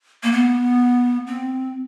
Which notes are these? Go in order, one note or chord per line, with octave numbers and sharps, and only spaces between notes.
A#3
B3
C4